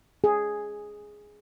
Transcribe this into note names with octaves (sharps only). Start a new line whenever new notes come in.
G#4